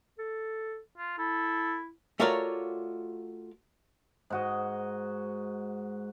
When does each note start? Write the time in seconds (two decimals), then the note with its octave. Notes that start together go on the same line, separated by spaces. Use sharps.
0.18 A4
0.98 F4
1.18 E4 A4
2.20 A3 F4 F#4 A#4 C#5 D5
4.30 G#2 F#4 D#5